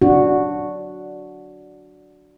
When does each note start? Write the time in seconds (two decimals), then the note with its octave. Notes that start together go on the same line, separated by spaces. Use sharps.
0.02 D4 F#4